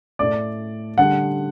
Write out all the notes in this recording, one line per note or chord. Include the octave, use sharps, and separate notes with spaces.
A2 A3 D5
D3 G3 F#5